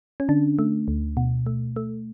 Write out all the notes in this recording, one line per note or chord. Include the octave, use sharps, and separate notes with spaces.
C#4
D3 D4
A3
D2
B2
A3
A3